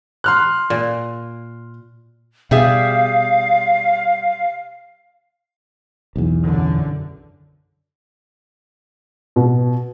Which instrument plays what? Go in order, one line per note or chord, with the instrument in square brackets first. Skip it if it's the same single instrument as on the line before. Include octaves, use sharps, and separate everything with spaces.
[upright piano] C6 F6 F#6
[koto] A#2
[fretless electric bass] B2 [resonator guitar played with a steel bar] G3 G#4 E5 [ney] F5
[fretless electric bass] B1 E2
[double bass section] F#2 D3
[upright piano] B2